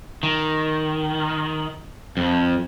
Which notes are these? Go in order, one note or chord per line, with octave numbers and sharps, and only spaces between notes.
D#3
F2